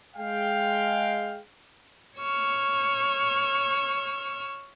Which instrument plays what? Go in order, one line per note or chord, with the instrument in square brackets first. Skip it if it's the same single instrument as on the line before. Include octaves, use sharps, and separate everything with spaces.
[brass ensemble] G#3 F5 G5
[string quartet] C#5 C#6 E6 F6